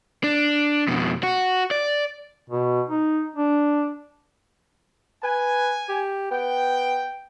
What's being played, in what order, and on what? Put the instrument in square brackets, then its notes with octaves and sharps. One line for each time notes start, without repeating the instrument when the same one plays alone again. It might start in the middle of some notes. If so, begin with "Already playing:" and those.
[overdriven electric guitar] D4
F2 B2
F#4
D5
[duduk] B2
D#4
D4
[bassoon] B4 [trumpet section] G#5
[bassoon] G4
[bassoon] B3 [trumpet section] G5